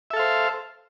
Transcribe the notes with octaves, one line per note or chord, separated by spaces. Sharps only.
A4 C5 E5 F5